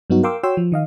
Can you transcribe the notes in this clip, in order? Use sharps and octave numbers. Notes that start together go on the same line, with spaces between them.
G2 F#3 B3 D#4 F#4
A#4 F5 G5 C6 D6 E6
F#4 C#5 G5 C6 E6
F3
D#3 D#5 F5